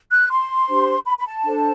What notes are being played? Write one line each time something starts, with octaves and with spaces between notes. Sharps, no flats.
F#6
C6
D4 G4 C5
B5
B5
A5
D4 A4 C5